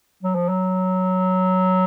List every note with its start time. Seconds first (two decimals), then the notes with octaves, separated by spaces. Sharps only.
0.23 F#3
0.35 F3
0.49 F#3